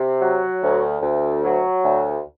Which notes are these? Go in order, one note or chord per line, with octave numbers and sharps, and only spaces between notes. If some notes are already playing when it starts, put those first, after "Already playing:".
Already playing: C3
F#3
D2
D2
F#3
D2